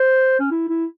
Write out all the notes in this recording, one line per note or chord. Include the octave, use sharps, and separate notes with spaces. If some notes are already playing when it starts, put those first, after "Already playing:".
Already playing: C5
C#4
E4
E4